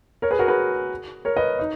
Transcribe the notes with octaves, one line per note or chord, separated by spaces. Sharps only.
A#4 C#5
G#4 B4
F#4 A#4
G#4 B4
A#4 C#5
B4 D#5
D#4